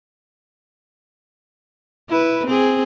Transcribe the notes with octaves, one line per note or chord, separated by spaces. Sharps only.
E4 B4
C4 G#4